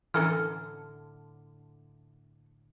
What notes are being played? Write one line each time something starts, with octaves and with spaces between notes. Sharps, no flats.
A2 D3 E3 C#4 A4 A#4 F6